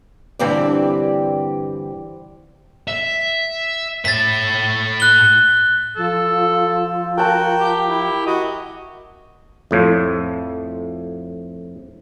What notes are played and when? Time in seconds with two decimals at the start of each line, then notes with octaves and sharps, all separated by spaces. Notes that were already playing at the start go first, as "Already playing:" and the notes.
0.39 G2 D3 E3 C4 G4 D5
2.88 E5
4.05 A2 E5 A6 B6
5.00 F#6 G7
5.97 F3 A4
7.18 F#4 A#4 G5 A5
7.60 G4
7.86 E4
8.26 F#4 D#5
9.71 F2 A2 F3